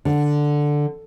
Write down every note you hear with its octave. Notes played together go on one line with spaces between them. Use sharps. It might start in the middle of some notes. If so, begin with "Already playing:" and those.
D3